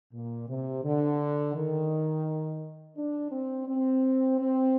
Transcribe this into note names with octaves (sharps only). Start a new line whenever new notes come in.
A#2
C3
D3
D#3
D4
C4
C4
C4